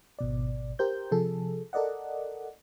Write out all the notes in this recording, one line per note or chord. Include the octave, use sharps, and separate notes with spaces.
G#1 B2 D5
G4 A#4 C5 G6
C3 F3 G#4 A4
A4 A#4 D5 D#5 F#5